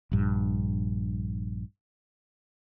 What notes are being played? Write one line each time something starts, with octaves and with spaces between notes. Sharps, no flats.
A#1 G2